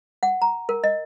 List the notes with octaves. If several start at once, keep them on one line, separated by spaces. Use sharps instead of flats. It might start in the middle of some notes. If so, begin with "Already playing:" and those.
F#5
A#5
A#4
D#5